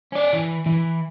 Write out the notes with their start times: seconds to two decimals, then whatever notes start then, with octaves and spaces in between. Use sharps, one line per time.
0.13 C#4 D5
0.33 E3
0.66 E3